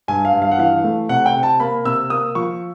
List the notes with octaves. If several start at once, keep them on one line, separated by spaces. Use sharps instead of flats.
G2 G#5
F5
G2
F5
F#5
E3 F5
A3
C3 F#5
G5
C3
A5
A#3 B5
C3 E6
A#3 D#6
F3 C#6